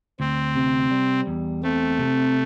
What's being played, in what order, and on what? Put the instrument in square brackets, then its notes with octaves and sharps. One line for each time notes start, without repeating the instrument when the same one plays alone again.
[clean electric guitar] D2 [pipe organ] C4
[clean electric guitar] C3
G3
E2
[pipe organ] A3 [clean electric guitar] C4
[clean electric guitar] C3